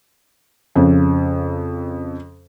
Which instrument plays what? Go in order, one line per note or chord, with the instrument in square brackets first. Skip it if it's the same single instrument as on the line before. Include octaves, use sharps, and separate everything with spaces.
[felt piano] F2 C#3